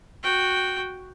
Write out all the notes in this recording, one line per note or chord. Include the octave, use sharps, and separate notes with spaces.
F#4 G5